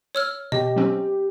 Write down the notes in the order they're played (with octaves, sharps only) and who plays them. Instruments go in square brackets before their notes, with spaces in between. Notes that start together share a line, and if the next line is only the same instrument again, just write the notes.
[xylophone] C#5 E6 F6
[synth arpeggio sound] B2 [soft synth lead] G4 [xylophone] D#5
[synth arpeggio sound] F#3 C4 C#4